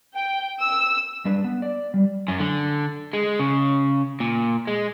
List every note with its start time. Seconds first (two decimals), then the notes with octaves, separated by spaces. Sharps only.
0.15 G5
0.60 E6
1.25 G3 D4 B4 D5
1.44 B3
1.62 D5
1.94 G3
2.28 F#2
2.40 D3
3.13 G#3
3.39 C#3
4.20 A#2
4.67 G#3